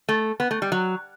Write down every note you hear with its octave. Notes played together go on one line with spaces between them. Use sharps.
A3
B3
A3
G3
F#3